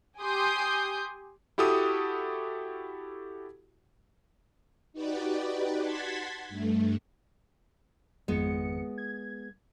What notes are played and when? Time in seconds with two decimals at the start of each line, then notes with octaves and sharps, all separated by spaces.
0.20 G4 G#5 C6 D#6 G6
1.58 E4 F#4 G4 A4 D#6
4.93 D#4 F#4 G4 B4 D5
5.79 F#5 A5 C6 G#6 A6 B6
6.49 G2 A3
8.28 G#1 F2 G#3 B3 C#7
8.98 G#6